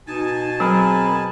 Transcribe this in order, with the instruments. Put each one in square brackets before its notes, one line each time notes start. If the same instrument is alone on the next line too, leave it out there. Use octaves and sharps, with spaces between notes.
[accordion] B2 G#5 A5 [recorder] D#4
[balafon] F#3 [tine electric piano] C4 G#4 A#4 [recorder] B5